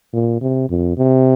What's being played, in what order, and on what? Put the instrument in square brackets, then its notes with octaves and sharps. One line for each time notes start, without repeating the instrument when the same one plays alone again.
[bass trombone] A#2
C3
F2
C3